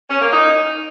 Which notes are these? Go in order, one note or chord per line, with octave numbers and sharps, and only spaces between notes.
C#4
A#3
D#4